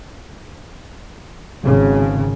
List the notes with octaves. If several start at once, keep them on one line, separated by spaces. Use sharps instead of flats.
G#1 C#3